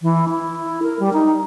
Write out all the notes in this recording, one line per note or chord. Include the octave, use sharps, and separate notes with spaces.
E3
E4
A#4
G3
D#4